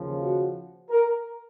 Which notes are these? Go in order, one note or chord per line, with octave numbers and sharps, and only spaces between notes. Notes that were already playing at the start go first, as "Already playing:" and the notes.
Already playing: D#2 C#3 F3
F#4
A#4